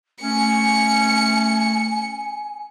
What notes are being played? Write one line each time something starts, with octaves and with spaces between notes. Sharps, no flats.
A3 C#4 G#5 C#7